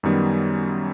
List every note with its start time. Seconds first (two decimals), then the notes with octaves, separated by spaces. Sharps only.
0.03 F#2 D#3 G3 B3